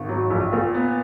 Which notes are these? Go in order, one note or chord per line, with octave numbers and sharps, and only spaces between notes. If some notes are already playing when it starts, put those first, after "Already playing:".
Already playing: G#1
F#3
A#1
A#2
B3